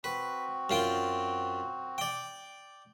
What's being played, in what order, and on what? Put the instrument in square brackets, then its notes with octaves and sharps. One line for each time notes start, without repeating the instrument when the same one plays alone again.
[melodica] C4 F#4 [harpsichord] B4
[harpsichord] F#2 F4 G5
D5 G5